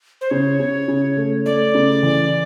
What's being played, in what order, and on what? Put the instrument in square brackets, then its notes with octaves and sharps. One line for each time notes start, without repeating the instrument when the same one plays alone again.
[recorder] C5
[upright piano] C#3 [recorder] C#5
[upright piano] C#3
C#3
A3
[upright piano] A3 [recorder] D5
[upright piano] C#3
E3